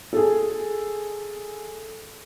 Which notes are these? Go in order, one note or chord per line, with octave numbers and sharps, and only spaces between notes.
G#4 A4